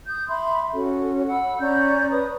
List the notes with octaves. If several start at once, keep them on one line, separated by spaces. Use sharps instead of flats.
D#6 G6
E5 B5 C6
C#4 F#4 A4
F#5 B5 E6
C#4 D5 A#5 G6
B4 D#6